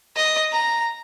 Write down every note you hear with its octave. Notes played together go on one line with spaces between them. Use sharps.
D#5
A#5